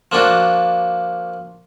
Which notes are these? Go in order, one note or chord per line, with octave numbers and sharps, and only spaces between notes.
F3 A#3 D4 F#4